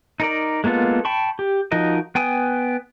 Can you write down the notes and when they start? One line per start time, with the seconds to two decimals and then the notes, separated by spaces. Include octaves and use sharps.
0.20 D#4 A#4 D5
0.64 G#3 A#3 B3 F4 A4
1.05 G5 A5 B5 C#6
1.39 G4
1.72 F3 D#4 F#4 A#4 D#5
2.15 B3 G5 G#5 D#6